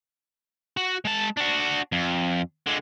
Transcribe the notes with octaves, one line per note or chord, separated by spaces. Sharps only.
F#4
G#3 A5
D4 F#4
F2
D3 G#3